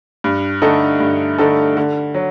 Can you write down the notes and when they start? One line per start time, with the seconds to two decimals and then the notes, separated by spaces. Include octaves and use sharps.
0.24 G2
0.62 D3 A3 D#4 A4
1.00 G2
1.38 D3 A3 D#4 A4
1.77 D3
2.14 F#3